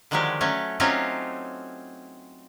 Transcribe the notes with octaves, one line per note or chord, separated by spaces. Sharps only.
D3 D#3 F3 F#3 G#3 G4
F#3 A3 C#4
F#3 C4 C#4 D#4 F4 G4